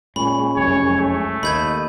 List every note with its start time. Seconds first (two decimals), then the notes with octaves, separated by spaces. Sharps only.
0.16 A#2 G#3 C#4 B5
0.57 F1 C2 F#2 C#5
0.97 A3
1.43 D#2 D#5 B5 G6 G#6